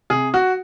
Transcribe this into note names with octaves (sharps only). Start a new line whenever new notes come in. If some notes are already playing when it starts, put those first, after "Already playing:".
C3 G#4
F#4